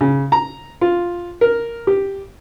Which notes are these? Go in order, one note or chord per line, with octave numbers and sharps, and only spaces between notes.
C#3
A#5
F4
A#4
G4